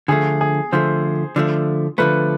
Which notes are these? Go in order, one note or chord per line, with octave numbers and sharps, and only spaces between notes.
D3 F3 A3 G#4
G#4
D3 F3 A3 C5
D3 F3 A3
D3 F3 A3 B4